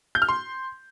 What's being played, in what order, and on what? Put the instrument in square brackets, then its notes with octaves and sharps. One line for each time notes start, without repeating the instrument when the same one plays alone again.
[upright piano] G6
F6
C6